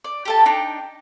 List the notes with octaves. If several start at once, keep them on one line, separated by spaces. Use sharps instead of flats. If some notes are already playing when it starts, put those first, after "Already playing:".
D5
G4 A4 A5
D4 D#4 G5